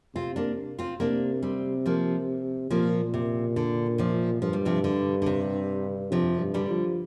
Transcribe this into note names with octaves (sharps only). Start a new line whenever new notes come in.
C3 C4 F4
A#3 D4
C4 F4
C3 A#3 D4
G3 C4
F3 A#3
A#2 F3 A#3
C3
D3
C3 F3
G2 F3
G3
C3 F3
D3
D3
C3
F2 C3 F3
G2
D3 G3
F3